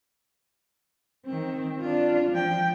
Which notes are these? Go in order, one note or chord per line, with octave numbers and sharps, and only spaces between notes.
D#3 C4
D4 F4
F3 G5